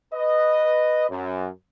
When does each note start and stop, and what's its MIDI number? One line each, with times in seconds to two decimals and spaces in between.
0.14 1.08 71
0.14 1.08 75
1.10 1.48 42